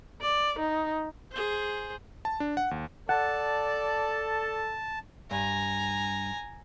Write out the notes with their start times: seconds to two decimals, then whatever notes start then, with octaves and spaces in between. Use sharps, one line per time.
0.21 D5
0.59 D#4
1.31 G#4 C5
2.25 A5
2.40 D4
2.57 F#5
2.71 D#2
3.09 A4 D5 F#5 A5
5.31 G2 G#5 A#5